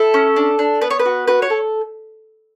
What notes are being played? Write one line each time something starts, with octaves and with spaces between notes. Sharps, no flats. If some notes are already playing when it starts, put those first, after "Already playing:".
Already playing: E4 A4
C#4
D4
D4
B3 B4
C#5
B4
F#4
F#4 B4
C#5
A4